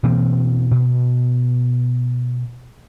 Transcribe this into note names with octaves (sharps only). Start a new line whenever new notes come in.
B2 E3 A#3 C4
B2